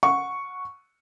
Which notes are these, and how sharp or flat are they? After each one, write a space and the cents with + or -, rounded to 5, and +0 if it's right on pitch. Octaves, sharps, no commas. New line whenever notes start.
F#5 -20 C#6 +0